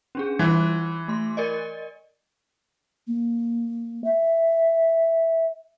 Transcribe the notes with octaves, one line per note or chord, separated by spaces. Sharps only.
C#4 D4 G#4
E3 G3 F#6
A3 C6
A#4 D5 D#5
A#3
E5